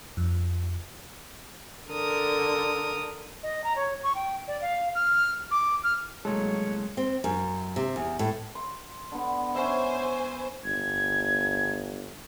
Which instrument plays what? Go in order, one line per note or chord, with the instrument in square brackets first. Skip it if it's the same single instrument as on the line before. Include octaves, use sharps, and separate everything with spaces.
[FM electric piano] F2
[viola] D3 [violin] A#4 D#6
[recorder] D#5
A#5
C#5
C#6
G5
D5
F5
F6
D6
F6
[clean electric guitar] C2 A2 A4 [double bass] F#3 A#3 [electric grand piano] G#3 [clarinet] C#5
[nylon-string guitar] C4
F#2
C3
E2
A2
[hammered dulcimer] C6
D3 B3
[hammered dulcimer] C#4 E5 [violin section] C5 G#5
[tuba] G1 [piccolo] G#6